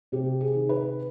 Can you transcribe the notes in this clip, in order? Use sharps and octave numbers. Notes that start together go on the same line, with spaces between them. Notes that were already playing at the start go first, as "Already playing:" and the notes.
C3 G4
G#4
D#3
B4